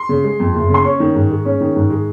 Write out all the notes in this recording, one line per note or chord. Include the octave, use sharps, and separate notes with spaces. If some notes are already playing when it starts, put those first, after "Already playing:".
Already playing: C6
C#3
G#3
F2
F#1
C#3 C6
C#4 C#6
D#3
G#2
G#3
C#4
D#3
G#2
G#3